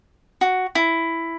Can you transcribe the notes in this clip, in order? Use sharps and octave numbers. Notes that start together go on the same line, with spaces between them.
F#4
E4